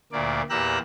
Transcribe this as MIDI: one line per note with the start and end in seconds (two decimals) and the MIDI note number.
0.12 0.42 38
0.12 0.42 46
0.12 0.42 58
0.12 0.42 74
0.50 0.78 40
0.50 0.78 46
0.50 0.78 67
0.50 0.78 82
0.50 0.78 88
0.50 0.78 90